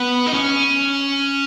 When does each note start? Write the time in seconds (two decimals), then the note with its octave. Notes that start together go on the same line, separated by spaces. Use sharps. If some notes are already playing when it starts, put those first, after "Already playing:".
Already playing: B3
0.26 D#4
0.33 C#4